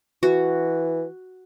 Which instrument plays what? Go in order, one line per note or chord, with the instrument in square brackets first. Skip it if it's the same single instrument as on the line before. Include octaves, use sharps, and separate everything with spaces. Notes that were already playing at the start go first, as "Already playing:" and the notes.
[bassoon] E3 [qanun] F#4